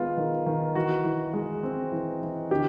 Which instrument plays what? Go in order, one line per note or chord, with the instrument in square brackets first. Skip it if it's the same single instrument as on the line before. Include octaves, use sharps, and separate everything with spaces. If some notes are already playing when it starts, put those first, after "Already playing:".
Already playing: [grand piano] D#3 G#3 B3 F4
D#3
D#3
E3 F#4
E3
G#3
C4
E3
E3
D3 G4